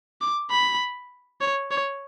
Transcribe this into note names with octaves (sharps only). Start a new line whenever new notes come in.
D6
B5
C#5
C#5